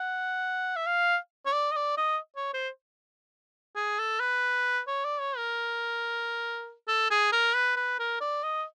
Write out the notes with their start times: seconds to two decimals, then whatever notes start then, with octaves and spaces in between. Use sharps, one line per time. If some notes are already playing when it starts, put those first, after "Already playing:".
Already playing: F#5
0.76 E5
0.86 F5
1.46 C#5
1.53 D5
1.71 D#5
1.76 D5
1.97 D#5
2.36 C#5
2.54 C5
3.76 G#4
3.99 A4
4.20 B4
4.87 C#5
5.04 D5
5.20 C#5
5.37 A#4
6.88 A4
7.11 G#4
7.32 A#4
7.55 B4
7.76 B4
7.99 A#4
8.21 D5
8.43 D#5